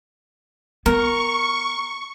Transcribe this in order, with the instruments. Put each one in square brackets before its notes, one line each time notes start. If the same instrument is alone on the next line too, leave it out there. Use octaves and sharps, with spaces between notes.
[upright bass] B3 [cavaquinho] A#4 [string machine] C#6